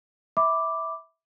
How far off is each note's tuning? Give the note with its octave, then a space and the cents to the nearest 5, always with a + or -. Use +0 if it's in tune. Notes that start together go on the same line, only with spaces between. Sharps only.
E5 -15 B5 +10 D6 +0